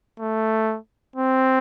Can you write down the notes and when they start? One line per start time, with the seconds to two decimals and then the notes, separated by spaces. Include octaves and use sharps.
0.20 A3
1.16 C4